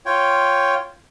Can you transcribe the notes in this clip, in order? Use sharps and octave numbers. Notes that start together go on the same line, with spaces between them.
F4 C#5 G5